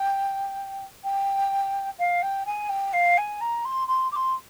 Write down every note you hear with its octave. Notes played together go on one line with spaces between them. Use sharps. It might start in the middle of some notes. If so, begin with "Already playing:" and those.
Already playing: G5
G5
F5
G5
G#5
G5
F5
G#5
A#5
C6
C6
D6
C6